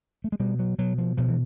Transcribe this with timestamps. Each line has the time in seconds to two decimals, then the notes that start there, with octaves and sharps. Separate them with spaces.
0.24 A3
0.32 G#3
0.40 B2 G3
0.59 F#3
0.79 B2 F#3
0.98 F3
1.17 B2 F3
1.28 E3